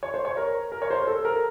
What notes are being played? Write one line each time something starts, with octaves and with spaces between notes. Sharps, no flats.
C#5
C5
C#5
A#4
A#4
C#5
C5
A#4
A4
A#4